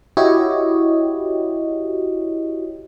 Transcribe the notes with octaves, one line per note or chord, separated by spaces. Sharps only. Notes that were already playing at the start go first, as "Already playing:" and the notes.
E4 F#4 G4 C#5 D#5